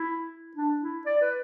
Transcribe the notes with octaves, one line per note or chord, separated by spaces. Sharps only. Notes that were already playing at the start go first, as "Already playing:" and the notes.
Already playing: E4
D4
E4
D5
B4